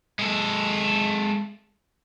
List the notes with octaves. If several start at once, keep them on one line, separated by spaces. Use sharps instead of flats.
G#3 A4